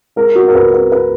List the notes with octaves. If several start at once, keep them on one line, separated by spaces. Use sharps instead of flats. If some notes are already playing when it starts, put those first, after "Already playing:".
G#3 A#4
F#4
A#4
C#2 B4
B4
B4